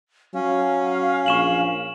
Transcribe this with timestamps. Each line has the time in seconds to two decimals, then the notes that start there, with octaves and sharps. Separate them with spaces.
0.34 F#3 C#4 F5
1.26 A#1 C#6 E7 F#7